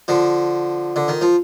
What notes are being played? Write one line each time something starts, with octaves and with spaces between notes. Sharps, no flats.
D3 F3
D3
D#3
F3